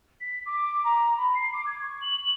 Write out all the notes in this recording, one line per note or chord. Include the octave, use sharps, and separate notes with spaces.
B6
D6
A#5
B5
C7
D6
G#6
C#6
F#7